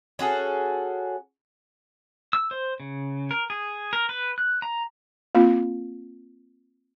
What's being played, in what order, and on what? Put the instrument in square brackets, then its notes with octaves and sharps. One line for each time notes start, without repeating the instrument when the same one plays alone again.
[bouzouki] C#4 F#4 G#4 A4
[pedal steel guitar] E6
C5
C#3
A#4
G#4
A#4
B4
F#6
A#5
[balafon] A#3 C4 F4